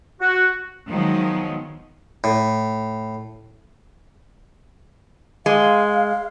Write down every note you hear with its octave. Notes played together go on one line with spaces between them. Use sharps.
F#4
D#3 F3 F#3 G#3 B3
A2
G#3 F5